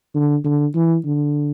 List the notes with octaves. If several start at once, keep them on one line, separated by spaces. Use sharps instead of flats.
D3
D3
E3
D3